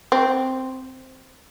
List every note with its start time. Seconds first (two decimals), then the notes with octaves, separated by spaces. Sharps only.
0.12 C4